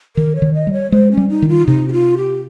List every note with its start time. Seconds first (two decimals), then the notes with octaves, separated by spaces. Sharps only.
0.16 D#3 A#4
0.36 C#5
0.42 D#3
0.54 D#5
0.67 G3
0.73 C#5
0.91 G#3 C5
1.12 C#4
1.17 G3
1.29 D#4
1.42 D#3
1.49 F4
1.67 C3 D#4
1.88 G4
1.93 F4
2.17 G4